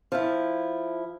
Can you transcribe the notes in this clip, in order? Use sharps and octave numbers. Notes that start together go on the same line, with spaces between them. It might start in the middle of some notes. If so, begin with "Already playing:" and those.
F3 E4